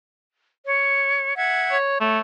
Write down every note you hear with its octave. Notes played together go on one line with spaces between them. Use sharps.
C#5
E5 F#5 G#6
C#5
A3 C#5